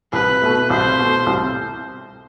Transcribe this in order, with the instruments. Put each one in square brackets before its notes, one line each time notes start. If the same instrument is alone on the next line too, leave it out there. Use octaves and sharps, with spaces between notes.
[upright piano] C2 [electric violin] B4
[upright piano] B2 A3
[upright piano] C2 [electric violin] C5
[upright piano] B2 A3
C2